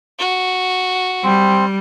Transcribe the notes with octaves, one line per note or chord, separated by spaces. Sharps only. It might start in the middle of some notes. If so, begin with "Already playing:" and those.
F#4
G3 C4